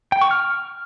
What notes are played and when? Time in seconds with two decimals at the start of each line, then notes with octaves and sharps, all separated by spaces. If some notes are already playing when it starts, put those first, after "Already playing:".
0.12 G5
0.21 C#6
0.31 F6